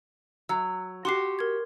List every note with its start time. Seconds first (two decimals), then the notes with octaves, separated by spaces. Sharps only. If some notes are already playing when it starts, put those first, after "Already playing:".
0.49 F#3 E6
1.05 F#4 G4 C6 D6 C7
1.39 A#4 G#6